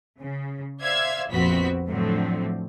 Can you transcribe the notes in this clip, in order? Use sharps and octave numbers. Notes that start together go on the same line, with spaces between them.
C#3
C5 D5 E5 F5 E6 G#6
A#1 F2 B3 C4 F#4 B6
A2 D3 F3 F#3 A3 C4